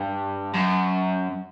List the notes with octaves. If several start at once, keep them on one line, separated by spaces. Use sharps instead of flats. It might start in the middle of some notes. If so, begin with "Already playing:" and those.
Already playing: G2
F#2